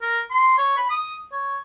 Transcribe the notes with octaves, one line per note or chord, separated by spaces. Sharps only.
A#4
C6
C#5
B5
D#6
C#5